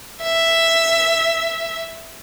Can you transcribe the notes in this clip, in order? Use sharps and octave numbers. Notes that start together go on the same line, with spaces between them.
E5